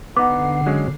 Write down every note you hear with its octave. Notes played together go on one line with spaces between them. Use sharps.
D3 B3 D#4 F#5 D6 C7
F#3 G#3 C#4